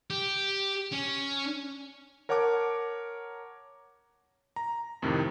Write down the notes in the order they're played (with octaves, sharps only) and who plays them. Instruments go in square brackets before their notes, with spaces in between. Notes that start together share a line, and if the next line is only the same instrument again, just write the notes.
[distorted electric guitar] G4
C#4
[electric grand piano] A#4 C#5 F#5 A5 D6
A#5
F2 A2 C3 D#3